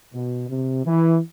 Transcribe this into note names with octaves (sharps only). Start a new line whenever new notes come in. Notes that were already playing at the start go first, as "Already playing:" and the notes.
B2
C3
E3